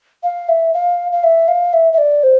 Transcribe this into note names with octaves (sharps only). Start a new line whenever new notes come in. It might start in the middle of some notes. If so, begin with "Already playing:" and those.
F5
E5
F5
F5
E5
F5
E5
E5
D5
C5